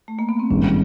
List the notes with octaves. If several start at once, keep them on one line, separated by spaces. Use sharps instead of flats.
A3
A#3
B3
C4
G#1 G2 D#3 G#3 C#4